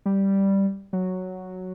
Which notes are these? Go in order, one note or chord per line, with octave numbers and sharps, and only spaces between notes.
G3
F#3